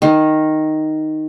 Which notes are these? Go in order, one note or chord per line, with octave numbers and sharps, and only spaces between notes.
D#3